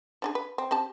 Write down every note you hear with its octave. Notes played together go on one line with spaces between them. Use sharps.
F3 D4 G#4
B4
C4
C4 G4 A5